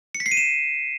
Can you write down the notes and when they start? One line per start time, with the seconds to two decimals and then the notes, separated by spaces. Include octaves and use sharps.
0.15 C#7
0.20 B6
0.26 C7
0.31 D#7
0.37 E7